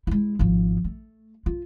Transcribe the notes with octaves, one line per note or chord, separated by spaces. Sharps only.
G#3 E4
G#1 F3
A3
F4